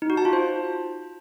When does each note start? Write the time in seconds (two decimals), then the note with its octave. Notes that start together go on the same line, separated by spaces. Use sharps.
0.02 D#4
0.10 F#4
0.17 A5
0.25 F4
0.33 C5